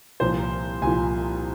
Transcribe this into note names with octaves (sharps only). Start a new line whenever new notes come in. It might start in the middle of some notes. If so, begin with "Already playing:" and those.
C2 A#2 F3 C5
C2 A#2 F3 G#5